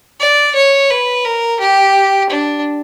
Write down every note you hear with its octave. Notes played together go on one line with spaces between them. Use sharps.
D5
C#5
B4
A#4
G4
D4